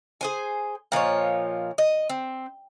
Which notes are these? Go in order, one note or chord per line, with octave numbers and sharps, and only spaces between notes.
G#4 C5 G#5
A#2 F3 D#4 C#5
D#5
C4